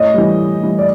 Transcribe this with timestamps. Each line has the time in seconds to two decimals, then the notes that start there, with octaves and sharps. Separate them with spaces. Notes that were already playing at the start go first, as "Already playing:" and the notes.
Already playing: A2 C#5 D#5
0.14 E3 G3
0.38 A2
0.61 E3 G3
0.79 D5